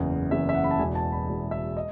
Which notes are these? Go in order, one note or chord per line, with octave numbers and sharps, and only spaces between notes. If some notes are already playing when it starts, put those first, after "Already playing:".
Already playing: F#1 E2 C#3
F#1 E2 C#3 E5
E5
F#5
B5
A5
E1 E2 B2 G#5
A5
B5
E1 E2 B2
E5
D#5